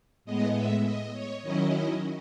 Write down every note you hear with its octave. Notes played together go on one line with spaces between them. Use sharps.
A2 G#3 B3 D#5
E5
D#5
C#5
D#3 F#3 C#4 E4 D#5